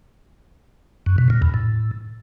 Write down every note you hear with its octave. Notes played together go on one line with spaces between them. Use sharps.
F#2
B2
A#2
E2
A2